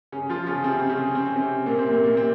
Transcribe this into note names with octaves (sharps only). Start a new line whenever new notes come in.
C#3 C#4
F3 F4
C#3 C#4
C3 C4
C4
C#3 C#4
C4
C#4
C3 C4
A#2 A#3
C3 C4
A#2 A#3
A#2 A#3
C3 C4